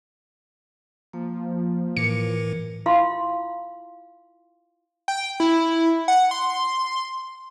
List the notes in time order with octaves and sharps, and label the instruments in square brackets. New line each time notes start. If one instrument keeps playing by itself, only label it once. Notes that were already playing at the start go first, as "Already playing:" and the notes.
[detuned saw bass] F3 [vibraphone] A#3
[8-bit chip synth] A2 E3 [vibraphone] A#4 D6 [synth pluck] C#7
[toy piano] E4 F4 F5 C6
[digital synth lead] G5
E4
F#5
C6